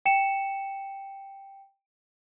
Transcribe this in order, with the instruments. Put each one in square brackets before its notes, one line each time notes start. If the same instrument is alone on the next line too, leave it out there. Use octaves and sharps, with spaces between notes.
[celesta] G5 C#7 E7